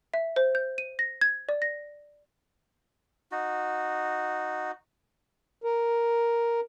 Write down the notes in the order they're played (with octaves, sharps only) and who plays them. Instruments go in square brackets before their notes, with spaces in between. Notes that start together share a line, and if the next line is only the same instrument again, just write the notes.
[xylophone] E5
C5
G6
D#7
A#6
G#6
D5
A#6
[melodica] D#4 F#4
[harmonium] A#4